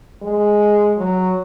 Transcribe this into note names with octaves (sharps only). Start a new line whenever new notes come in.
G#3
F#3